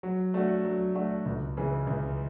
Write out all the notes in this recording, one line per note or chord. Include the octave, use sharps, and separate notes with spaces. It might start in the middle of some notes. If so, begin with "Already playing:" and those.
F#3
A3 D4 F#4
F#3
A3 D4 F#4
C#2
C#3 E3
C#2